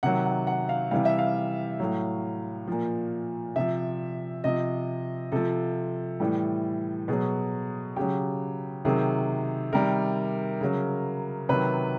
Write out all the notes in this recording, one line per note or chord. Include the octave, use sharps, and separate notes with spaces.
C3 D#3 F#3 F#5
F#5
F#5
F5
C3 E3 G3 F5
E5
F5
A2 F#3
A#2 F3
C3 F3 E5
C3 F3 D#5
C3 F3 A4
A2 E3 G3
B2 F#3 G#4
C#3 F#3 G4
C3 D#3 F#3 G#4
C3 D#3 G3 A#4
C#3 F#3
C3 D#3 F#3 B4